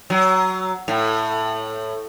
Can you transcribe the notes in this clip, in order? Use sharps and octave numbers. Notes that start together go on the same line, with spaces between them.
F#3
A2